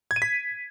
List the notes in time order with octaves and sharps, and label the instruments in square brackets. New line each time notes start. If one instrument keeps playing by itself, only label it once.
[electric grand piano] G#6
D#7
B6